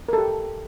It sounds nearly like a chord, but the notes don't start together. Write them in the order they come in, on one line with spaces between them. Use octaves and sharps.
A#4 A4 G4